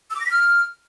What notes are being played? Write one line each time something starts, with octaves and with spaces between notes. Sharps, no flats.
E6
D6
A#6
B6
F6